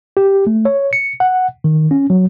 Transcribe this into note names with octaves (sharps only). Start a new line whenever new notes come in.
G4
A3
C#5
C#7
F#5
D#3
C#4
F#3